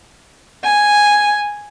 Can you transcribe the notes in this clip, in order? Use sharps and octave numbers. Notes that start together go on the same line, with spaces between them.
G#5